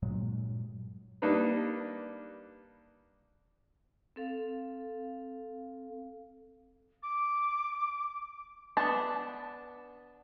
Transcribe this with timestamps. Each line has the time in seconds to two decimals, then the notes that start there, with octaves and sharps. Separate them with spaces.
0.02 G2 A#2 F#3 G#3
1.22 G3 A#3 D4 D#4 B4
4.16 C4 A4 F5
7.03 D6
8.77 B3 D4 A5